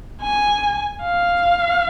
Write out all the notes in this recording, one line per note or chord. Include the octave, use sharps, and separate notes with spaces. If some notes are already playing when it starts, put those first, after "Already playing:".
G#5
F5